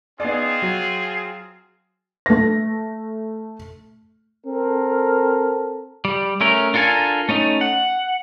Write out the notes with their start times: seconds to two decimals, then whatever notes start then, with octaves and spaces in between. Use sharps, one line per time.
0.20 B3 C4 D#4 F4 G#4 D5
0.62 F#3
2.26 A3 A#6
4.47 C4 A4 A#4
6.05 G3
6.41 A3 C#4 A#4
6.74 D4 F4 A4 A#4 G#5
7.29 A3 C#4 D#4
7.61 F#5